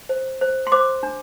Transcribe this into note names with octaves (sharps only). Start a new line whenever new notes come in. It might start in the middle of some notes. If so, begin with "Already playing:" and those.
C5
C5
C6
C5 D6
D4